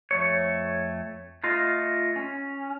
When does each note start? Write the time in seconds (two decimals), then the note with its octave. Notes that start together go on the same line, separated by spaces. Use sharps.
0.11 F2 A3 C#5
1.44 A3 F4 D#5
2.16 C#4